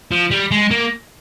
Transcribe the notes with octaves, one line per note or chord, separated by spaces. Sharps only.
F3
G3
G#3
A#3